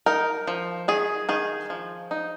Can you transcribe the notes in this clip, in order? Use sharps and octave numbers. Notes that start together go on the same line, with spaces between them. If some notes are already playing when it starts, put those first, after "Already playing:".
D#4 A#4
F3
D#3 G#4
D#3 G#4
F3
D#4